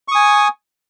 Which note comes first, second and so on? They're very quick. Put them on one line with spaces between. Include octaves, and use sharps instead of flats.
C#6 D#6 G#5